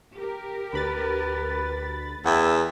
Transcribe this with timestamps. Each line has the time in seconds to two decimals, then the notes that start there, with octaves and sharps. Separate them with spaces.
0.16 G4 A#4
0.73 D2 B4 B5 A6
2.25 E2 E5 F#5 G5